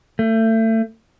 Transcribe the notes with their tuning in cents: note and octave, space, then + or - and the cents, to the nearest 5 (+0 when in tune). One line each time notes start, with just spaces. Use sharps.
A3 +30